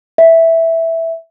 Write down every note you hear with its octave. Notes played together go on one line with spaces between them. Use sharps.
E5